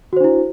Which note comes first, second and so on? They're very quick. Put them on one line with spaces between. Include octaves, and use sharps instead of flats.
F#4 C5 D4 E4